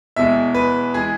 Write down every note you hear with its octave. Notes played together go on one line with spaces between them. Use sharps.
E2 B2 G#3 E5
B4
E3 G#3 G#4